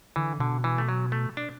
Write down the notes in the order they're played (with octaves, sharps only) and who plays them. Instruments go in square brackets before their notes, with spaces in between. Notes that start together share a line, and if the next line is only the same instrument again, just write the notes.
[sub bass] D3 [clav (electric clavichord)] E3
[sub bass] B2 [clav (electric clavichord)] D3
[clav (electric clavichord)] E3
A3
F#3
A3
D4